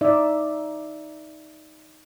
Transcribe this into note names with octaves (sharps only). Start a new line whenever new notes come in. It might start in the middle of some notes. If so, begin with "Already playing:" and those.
D#4 D5 E5